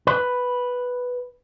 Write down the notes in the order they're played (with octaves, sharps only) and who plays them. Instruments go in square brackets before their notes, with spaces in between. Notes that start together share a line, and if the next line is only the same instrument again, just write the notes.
[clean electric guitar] B4